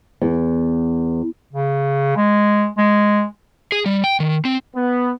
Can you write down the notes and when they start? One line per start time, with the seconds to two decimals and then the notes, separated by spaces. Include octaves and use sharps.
0.22 E2
1.53 C#3
2.17 G#3
2.77 G#3
3.72 G#4
3.86 G3
4.04 G5
4.20 D#3
4.45 C4
4.75 B3